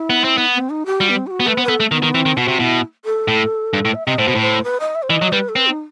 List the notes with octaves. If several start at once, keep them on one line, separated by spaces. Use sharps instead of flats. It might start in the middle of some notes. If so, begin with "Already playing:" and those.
Already playing: E4
B3
C4
B3
C4
D#4
G4
G3 F#4
B3
C4
G4
F#4
B3
A3 B4
B3 C5
B4
B3 A4
A3
D#3 B3
D#3
E3 C4
D#3
B2 F#4
C3
B2 E4
A4
A2
G2
A2
E5
C3 D#5
A2 C5
B2
A2
C5
B4
D#5
E5
C5
E3 D#5
F#3
G3 B4
A4
C4 B4
D#4